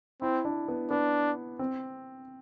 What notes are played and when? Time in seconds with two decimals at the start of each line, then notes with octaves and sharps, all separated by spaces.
0.22 C4 E4
0.45 D4
0.68 B3
0.91 B3 D4
1.59 C4